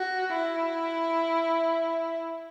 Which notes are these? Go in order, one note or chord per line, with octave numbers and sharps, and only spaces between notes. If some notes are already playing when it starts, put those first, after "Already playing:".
Already playing: F#4
E4